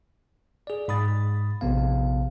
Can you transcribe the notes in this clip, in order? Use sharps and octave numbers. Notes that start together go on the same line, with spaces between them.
G#4 D5
G#2 B5 D#6 A6
A#1 C3 B3 F5